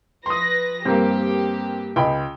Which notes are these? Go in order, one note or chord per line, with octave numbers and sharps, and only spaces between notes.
F3 B4 C6 D#6 A#6
G2 A#3 C4 G4 A#4
C#2 D#5 G5 B5